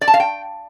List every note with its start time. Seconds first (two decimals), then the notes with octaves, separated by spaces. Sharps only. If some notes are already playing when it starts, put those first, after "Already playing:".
0.01 D5
0.08 A5
0.14 F5
0.20 G5